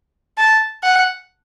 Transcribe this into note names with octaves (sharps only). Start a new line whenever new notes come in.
A5
F#5